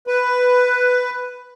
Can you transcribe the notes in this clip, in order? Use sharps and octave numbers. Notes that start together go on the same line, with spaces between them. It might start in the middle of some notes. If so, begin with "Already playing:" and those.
B4